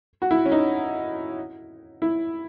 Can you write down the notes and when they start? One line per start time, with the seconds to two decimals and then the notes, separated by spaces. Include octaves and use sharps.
0.22 F#4
0.31 E4
0.46 C#4
0.52 D#4
2.02 E4